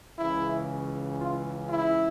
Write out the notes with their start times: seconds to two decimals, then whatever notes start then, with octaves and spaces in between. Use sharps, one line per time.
0.18 C#2 C#3 E3 E4
1.20 F4
1.69 E4